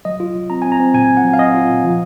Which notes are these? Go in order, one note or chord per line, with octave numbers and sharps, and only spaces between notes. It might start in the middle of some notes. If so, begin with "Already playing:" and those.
F#3 D#5
F4
F#3
C4 A#5
C4 G#5
A#5
C4
A#2 G#5
A#2
F#5
F#3
F5
C4 D#5
F4
A#2
F3